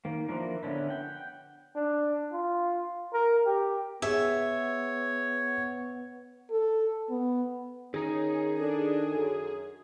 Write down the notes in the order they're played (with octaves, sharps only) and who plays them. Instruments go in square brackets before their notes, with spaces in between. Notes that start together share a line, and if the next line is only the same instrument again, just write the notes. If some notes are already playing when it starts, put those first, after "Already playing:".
[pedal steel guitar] D#3 A#3
E3 F3 A#3 D4 A#4
D3 B3 C#4 D4 E4
F#5 G5
[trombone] D4
F4
A#4
G4
[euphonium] B3 [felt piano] G#4 [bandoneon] C#5 [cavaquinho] E5
[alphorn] A4
B3
[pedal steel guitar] D#3 D#4 [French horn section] C#4 [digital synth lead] G#4
[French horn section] D4 [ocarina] A4
[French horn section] F#2